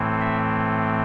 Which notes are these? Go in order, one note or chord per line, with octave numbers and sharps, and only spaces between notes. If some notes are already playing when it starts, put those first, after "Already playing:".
Already playing: A2 E3 A3 C4
E5